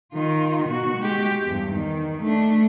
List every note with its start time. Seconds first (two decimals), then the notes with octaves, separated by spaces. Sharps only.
0.12 D#3 F4
0.68 B2 F#4
0.97 G#3 G4
1.45 E2 G2
1.73 D#3
2.22 A3 D4